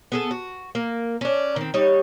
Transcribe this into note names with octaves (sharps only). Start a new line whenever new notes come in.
B3 G#4 A4
F#4
A#3
C#4 D4
D#3 C4
G3 D#4 C#5